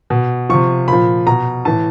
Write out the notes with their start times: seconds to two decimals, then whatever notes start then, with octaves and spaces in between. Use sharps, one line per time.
0.10 B2
0.49 C3 F3 C#6
0.88 A#2 F3 B5
1.27 B2 A#5
1.65 A2 E3 A5